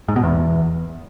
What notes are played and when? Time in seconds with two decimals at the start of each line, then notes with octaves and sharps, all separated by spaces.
0.09 G#2
0.16 B2
0.24 E2